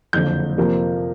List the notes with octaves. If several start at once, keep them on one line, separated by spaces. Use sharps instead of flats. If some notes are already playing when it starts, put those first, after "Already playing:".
F#1 F2 D3 G6
F2 C3 F3 A#3